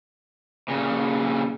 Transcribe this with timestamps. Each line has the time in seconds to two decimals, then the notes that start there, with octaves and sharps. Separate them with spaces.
0.68 A#2 C#3